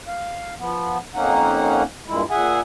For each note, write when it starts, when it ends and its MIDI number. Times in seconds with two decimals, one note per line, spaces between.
0.08 0.54 77
0.59 0.98 53
0.59 0.98 59
1.15 1.83 41
1.15 1.83 58
1.15 1.83 61
1.15 1.83 63
1.15 1.83 78
2.08 2.23 43
2.08 2.23 46
2.08 2.23 56
2.08 2.23 64
2.31 2.60 46
2.31 2.60 68
2.31 2.60 76
2.31 2.60 78
2.31 2.60 80